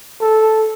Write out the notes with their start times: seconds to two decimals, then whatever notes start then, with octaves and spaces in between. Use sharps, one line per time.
0.21 A4